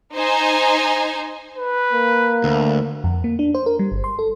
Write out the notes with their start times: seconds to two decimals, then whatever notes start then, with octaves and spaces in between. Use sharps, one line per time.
0.15 D#4 C5 G#5
1.57 B4
1.93 A#3
2.44 D2
3.04 F2
3.24 A#3
3.39 D4
3.54 C5
3.66 A#4
3.79 G3
3.92 G1
4.04 C6
4.19 A4